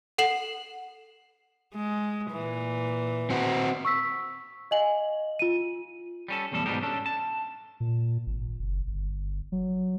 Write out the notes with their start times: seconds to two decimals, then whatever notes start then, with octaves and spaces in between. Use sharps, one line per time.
0.18 A4 F#5 C7 E7 F#7
1.75 G#3
2.31 A#2 E3
3.30 C4 F#4
3.85 C#6 E6 B6
4.71 D#5 F5 G#5 F#7
5.39 F4 D#7
6.28 G3 C#4 A4
6.52 B1 E2 A2 G3 A4
6.66 G#2 B2 G3 G#3 D#4 G4
6.83 C#4 D4 A4
7.06 A5
7.80 A#2
8.27 G#1
8.59 F#1
8.87 G1
9.52 F#3